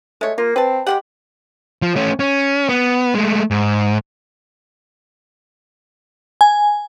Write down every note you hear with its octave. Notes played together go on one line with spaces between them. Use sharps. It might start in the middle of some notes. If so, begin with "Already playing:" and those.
G#3 A3 C#5
A#3 F4
C4 B4 A5
G#3 B3 G4 F#5
F3
A3 C#4
C#4
B3
G#3 A3
G#2
G#5